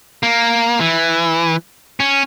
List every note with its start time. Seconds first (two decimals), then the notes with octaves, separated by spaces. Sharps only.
0.23 A#3
0.80 E3
2.00 C#4